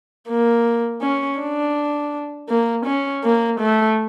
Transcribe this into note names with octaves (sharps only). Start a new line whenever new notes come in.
A#3
C#4
D4
A#3
C#4
A#3
A3